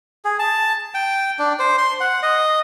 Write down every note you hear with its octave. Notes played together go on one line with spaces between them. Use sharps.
G#4
A5
G5
D4
C5
C6
F#5
D#5